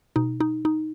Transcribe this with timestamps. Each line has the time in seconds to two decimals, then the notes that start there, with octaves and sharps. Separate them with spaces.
0.16 B2 D#4
0.40 D#4
0.65 D#4